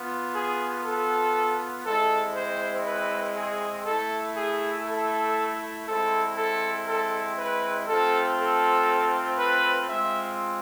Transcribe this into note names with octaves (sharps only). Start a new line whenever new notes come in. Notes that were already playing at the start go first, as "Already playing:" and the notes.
Already playing: B3 F4
G#4
A4
G#3 C4 E4 A4
C5
B4
G#4
A3 E4 A4
G#4
A4
G#3 C4 E4 A4
A4
A4
B4
A3 C4 F4 A4
A4
B4
G#3 C4 F4 E5